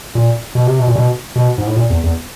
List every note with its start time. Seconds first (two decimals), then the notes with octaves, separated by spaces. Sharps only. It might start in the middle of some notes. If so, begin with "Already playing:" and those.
0.15 A#2
0.55 B2
0.67 C3
0.79 B2
0.87 A#2
0.96 B2
1.36 B2
1.58 G#2
1.67 A2
1.76 A#2
1.90 E2
2.03 E2